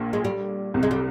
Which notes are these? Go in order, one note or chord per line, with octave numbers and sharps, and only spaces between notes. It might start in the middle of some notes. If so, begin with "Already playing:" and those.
Already playing: A#1 A#2
G#3
G3
C2 C3
G#3
G3